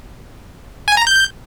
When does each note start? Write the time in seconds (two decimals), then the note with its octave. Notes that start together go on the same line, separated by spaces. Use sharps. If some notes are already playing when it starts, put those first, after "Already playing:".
0.88 G#5
0.97 A#5
1.07 G6